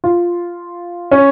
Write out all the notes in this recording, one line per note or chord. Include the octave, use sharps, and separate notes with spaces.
F4
C#4